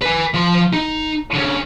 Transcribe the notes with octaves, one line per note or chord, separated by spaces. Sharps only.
B4 G#5
F3 C6
D#4
D3 C#4